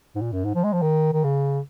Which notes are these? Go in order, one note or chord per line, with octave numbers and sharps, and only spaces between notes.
G#2
A#2
F#2
G#2
F3
G#3
F3
D#3
D#3
C#3